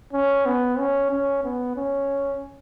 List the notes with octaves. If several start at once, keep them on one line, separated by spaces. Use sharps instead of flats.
C#4
B3
C#4
C#4
B3
C#4